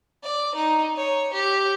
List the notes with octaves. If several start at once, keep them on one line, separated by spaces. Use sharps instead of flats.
D5
D#4
C#5
G4